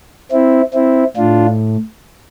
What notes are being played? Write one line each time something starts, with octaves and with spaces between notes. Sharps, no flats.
C4 E4
C4 E4
A2 D4 F4